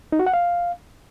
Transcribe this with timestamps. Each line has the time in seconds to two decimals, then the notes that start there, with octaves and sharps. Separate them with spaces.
0.12 D#4
0.19 F#4
0.26 F#5
0.33 F5